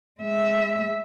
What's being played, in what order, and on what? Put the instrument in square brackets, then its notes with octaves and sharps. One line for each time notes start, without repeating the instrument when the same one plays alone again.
[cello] G#3 E5